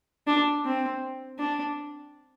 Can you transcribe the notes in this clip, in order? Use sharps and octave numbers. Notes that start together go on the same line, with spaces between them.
D4
C4
D4